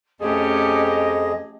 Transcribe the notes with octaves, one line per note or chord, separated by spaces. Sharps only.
F2 A3 C#4 G4 G#4 D#5